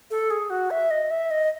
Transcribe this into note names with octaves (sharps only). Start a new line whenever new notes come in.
A4
G#4
F#4
E5
D#5
E5
D#5